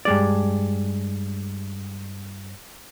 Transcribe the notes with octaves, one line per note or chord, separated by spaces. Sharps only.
G2 G#3 D5